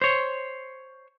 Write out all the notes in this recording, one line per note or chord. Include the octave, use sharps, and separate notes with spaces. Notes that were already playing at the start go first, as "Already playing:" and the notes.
C5 C#5